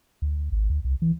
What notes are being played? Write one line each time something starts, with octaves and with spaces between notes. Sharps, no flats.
D2
G#1
D2
C2
E3